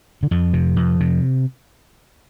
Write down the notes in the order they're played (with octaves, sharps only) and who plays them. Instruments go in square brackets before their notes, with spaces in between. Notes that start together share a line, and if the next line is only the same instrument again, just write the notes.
[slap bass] D3
F2 F3
C3
F2
C3